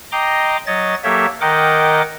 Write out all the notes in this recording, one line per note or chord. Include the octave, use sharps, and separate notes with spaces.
D#5 G5 A#5 C6 D6
F#3 C#5 D#5 A6
F#3 A#3 G4 A4 C#5 E5
D#3 A#4 D#5 F#5 G5 D6